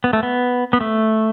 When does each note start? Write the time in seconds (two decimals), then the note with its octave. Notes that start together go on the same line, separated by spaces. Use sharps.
0.04 B3
0.13 A3
0.23 B3
0.73 B3
0.81 A3